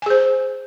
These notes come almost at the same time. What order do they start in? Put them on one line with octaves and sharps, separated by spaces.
G#5 G#4 C5